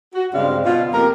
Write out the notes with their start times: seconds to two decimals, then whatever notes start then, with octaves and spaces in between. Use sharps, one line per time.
0.14 F#4
0.33 G2 C#3 G#3 C4 D4 F5
0.65 B2 F4
0.93 F2 A#3 G4 A#4